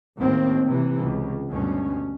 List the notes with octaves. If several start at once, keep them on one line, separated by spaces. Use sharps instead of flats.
A1 D#2 A2 D#3 C4
C3 E3
C#2
D2 G2 B2 C#4